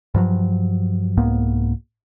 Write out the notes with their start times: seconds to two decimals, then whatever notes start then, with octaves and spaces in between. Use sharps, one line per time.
0.14 G2 F3 F#3
1.17 C2 G#2 A#3 B3